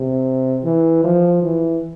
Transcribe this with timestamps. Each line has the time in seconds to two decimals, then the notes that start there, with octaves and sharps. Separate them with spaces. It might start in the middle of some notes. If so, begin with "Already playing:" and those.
Already playing: C3
0.64 E3
1.04 F3
1.43 E3